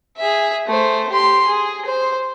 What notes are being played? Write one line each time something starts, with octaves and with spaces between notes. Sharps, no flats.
G#4 E5
A3 C5
G4 C6
G#4
C5